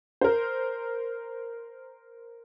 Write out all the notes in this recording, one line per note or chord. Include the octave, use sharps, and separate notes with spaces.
A#4 C5